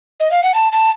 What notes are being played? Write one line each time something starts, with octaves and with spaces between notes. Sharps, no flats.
D#5
F5
F#5
A5
A5